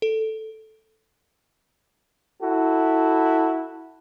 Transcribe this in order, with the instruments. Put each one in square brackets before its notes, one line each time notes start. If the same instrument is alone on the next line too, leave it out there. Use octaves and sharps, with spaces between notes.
[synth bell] A4
[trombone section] E4 F#4 A4